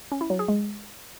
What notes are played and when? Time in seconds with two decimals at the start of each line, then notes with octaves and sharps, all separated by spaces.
0.12 C#4
0.21 E4
0.30 F#3
0.39 G#4
0.48 G#3